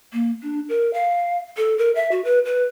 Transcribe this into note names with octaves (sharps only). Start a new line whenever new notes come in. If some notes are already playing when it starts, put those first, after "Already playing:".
A#3
D4
A#4
F5
A4
A#4
E5
F#4
B4
B4